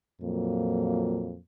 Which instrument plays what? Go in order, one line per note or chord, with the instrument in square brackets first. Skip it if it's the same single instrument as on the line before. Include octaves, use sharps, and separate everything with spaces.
[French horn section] F2 A#2 F#3 A#3